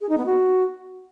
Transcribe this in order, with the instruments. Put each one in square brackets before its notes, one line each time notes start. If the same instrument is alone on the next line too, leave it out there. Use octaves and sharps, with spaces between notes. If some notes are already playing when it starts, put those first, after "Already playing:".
[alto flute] G#4
D#4
B3
F#4